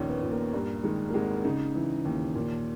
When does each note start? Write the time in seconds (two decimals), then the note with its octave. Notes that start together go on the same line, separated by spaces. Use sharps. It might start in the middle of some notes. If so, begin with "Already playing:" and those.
Already playing: A#1 D#2 A#2 C#4 D#4
0.08 B3
0.23 A#2
0.31 A#3
0.53 G2 A#3
0.84 D#3 G#3
1.09 A#3
1.14 G#1 G#3
1.44 C#3 D#4
1.75 E3
2.05 D#2
2.35 A#2